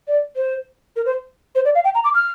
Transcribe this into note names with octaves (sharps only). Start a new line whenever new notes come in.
D5
C5
A#4
C5
C5
D5
F5
G5
A#5
D6
F6